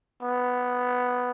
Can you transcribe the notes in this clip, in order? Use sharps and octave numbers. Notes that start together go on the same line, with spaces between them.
B3